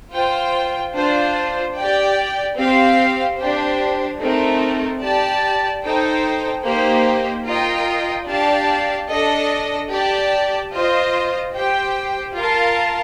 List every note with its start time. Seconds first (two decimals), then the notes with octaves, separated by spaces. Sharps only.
0.12 F4 C5 G5
0.93 D4 F4 C5
1.75 G4 D5 G5
2.56 C4 G4 C5 F5
3.38 D4 G4 C5
4.20 A3 C4 D#4 A#4
5.01 G4 D5 A5
5.83 D#4 A4 C5 G5
6.64 A#3 D#4 G4 C5
7.45 F4 A#4 D#5 G5
8.28 D4 G4 D5 F5 A5
9.09 D4 A4 D#5
9.91 G4 D5 A5
10.72 F4 C5 D#5
11.53 G4 C5 G5
12.34 F4 A#4 F5 A5